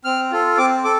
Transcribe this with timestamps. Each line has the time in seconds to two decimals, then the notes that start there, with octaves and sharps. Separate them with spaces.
0.04 C4 F6
0.32 F4 A4
0.58 C4 D6
0.84 A4 D6